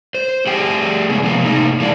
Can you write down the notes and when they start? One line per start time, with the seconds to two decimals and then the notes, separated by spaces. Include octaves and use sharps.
0.15 C5
0.47 A3 G4 G#4 G5
1.09 C#3 G#3 B3
1.23 C3 F3 G#3 A#3
1.45 A2 C3 A#3 D#4
1.80 E3 G#3 A#3 D4